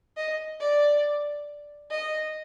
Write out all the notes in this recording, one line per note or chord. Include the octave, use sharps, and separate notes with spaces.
D#5
D5
D#5